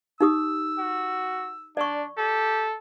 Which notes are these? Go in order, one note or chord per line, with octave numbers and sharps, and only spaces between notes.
D#4 G4 D#6 E6
F#4
D4 D5 C#6
G4 A4